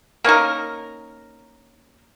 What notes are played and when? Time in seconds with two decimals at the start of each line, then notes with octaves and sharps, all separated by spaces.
0.24 A#3 C#4 D#4 A#4